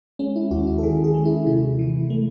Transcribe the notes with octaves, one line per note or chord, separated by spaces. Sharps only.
G#3 C#4
E4
D#2 F#4
E4
A4
D#3 G#4
G#4
G#3
E4
C3 E4
E3
A3